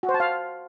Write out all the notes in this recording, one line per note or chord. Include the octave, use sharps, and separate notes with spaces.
F#4
C5
A5
F5